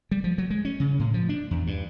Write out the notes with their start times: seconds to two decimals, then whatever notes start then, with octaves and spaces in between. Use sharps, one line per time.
0.11 G3
0.24 F3
0.38 F#3
0.50 G#3
0.65 C#4
0.80 C#3
0.99 A2
1.14 F3
1.29 D4
1.51 E2
1.67 G2